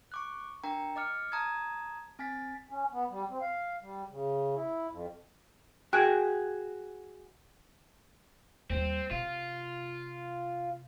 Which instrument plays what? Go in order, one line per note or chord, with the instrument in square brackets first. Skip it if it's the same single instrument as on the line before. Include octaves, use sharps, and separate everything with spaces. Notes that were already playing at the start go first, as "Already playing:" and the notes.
[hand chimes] C#6 D6 F#6
D4 A#4 G5 A#5
D#5 D6 F6 C#7
A5 A#5 D#6 G#6
C4 G#5 A6 B6
[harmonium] C#4
B3
G3
C4
F5
G3
C#3
E4
F2
[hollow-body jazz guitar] F#4 G#4 [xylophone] G5 F#6 D7
[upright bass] D#2 G3 [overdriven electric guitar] C4
[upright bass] C3 [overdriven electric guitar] F4